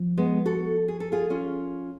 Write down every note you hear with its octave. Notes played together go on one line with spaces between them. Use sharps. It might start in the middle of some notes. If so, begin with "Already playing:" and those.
Already playing: F3
G#3 B3
F#4 A4
G#4
A4
F4 G#4
C#4 F4